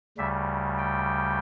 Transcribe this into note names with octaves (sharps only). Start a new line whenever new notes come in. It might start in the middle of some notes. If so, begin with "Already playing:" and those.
D2 C#3 G3 E5
G5